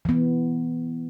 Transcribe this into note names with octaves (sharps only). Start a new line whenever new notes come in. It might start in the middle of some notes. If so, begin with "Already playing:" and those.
E3 B3